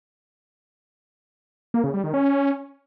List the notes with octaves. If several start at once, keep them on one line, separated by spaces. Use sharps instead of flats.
A#3
C#3
G3
D#3
C#4